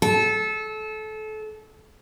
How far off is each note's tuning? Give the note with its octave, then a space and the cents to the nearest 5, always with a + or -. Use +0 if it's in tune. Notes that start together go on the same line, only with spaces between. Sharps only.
A4 -25